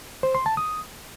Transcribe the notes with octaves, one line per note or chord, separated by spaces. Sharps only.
C5
C6
A5
D#6